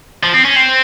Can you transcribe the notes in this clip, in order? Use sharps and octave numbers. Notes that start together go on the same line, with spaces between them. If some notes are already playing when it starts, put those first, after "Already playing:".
F3
C4
C#4
C4